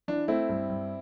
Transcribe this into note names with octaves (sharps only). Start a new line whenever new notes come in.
E3 D4
A3 C4 E4
G2
G2